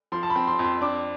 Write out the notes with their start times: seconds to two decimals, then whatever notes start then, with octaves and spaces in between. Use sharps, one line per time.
0.12 F3 C6
0.23 A5
0.30 B5
0.36 C4
0.47 C6
0.59 F2
0.64 C6
0.81 D4 D6